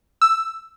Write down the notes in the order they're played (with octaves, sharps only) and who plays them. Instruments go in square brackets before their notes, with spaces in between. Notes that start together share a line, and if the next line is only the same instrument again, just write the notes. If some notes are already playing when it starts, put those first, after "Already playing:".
[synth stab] E6